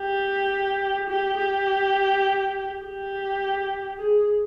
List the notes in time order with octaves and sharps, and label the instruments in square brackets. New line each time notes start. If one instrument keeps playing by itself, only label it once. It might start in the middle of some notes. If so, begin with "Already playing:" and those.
Already playing: [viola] G4
G4
G4
G4
G#4